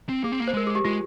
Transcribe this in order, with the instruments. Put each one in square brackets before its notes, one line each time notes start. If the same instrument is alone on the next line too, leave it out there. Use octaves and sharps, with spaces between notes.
[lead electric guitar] C4
[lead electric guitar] A#3 [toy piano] G#4
[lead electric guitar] C4
A#3
[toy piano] C5
[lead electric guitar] G#3 [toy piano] A#4
[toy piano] G#4
G4
[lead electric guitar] G#3 [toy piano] F4